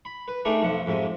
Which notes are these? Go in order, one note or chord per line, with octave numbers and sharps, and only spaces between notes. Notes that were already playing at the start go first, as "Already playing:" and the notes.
B5
B4
A3 D4 D#4 G#4 A#4
B1 F2 F#5
F2 G#2 C3